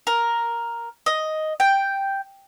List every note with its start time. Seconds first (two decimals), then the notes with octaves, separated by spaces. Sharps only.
0.07 A#4
1.06 D#5
1.60 G5